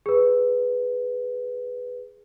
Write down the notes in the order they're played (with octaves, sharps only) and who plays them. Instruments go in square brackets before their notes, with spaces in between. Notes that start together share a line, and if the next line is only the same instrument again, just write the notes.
[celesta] G#4 B4